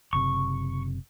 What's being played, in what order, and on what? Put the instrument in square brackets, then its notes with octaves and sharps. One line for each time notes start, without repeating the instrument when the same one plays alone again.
[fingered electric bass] F#1 C3 [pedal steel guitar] C#6